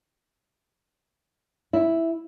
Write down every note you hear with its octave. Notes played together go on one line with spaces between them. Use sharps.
E4